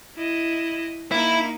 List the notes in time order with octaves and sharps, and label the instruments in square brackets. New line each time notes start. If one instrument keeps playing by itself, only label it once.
[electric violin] E4 D#5
[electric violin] A#3 D#4 [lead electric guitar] E4